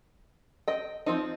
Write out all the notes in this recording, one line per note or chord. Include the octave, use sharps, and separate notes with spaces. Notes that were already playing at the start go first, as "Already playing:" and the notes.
D#5 G5
F3 C4 D#4